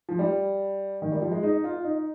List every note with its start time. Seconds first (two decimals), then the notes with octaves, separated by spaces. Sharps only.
0.09 F3
0.19 G3
1.02 D#3
1.12 G3
1.22 F3
1.32 G#3
1.43 D#4
1.64 F4
1.84 D#4